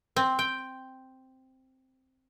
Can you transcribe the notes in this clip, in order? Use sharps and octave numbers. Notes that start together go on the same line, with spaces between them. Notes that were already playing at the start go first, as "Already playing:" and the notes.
C4
G5